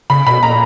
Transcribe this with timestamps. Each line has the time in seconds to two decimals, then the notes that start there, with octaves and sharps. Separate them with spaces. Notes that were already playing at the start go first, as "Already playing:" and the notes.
0.10 C#3 B5
0.27 B2 B5
0.42 A#2 A#5